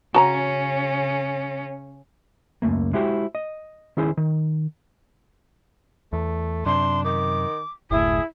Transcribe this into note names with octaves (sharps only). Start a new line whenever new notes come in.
C#3 C#4 F#4 A5 A#5
C#2 F#2 A#2 A3 A#3
G#3 E4 F#4 G4 C5
D#5
D#3 C#4 E4 G#4 C5
D#3
E2 A3
F#2 C3 D4 C6
D#3 D6
F#1 D2 A2 E4 G#4